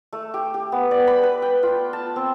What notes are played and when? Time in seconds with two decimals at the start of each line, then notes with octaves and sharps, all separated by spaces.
0.13 A3
0.34 G4
0.54 G4
0.72 B3
0.91 D5
1.07 B5
1.23 B4
1.42 G5
1.63 F4
1.93 A5
2.16 C4